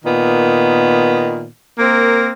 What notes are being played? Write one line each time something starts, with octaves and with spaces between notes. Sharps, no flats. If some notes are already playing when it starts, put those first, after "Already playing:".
A#2 D#3 B3
A#3 C4 A#4